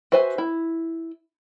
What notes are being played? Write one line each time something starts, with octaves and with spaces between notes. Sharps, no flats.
F#4 B4 C5 E5 G#5
E4